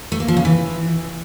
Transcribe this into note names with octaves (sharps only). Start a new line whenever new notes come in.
A3
A#3
F3
C#3
E3